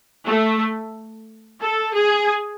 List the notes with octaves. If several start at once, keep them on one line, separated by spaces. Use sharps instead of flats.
A3
A4
G#4